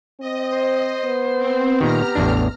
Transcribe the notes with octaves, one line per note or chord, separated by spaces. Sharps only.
C4 D#5
C5
B3
C4
A#2 D#3 G4 A#5 F6
A1 E2 D4